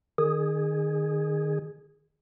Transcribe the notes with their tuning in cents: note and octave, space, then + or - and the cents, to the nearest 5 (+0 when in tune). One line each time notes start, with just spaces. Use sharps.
D#3 -30 G#4 -5